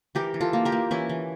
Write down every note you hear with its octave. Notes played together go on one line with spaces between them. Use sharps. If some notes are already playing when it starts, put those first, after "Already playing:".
E3 G4 A#4
E3
F4 A4
A#3
G4 A#4
A#3
E3 C#4 E4
E3